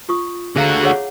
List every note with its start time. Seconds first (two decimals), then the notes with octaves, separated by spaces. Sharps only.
0.09 F4 C#6 D#6
0.56 D3 F#4 G#4 F5 A#5
0.83 G#4 C#5 F#5